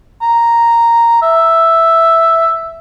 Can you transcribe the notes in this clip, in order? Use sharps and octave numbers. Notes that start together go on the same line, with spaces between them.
A#5
E5